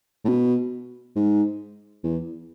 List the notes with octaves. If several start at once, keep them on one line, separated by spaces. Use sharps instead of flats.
A2
B2
G#2
E2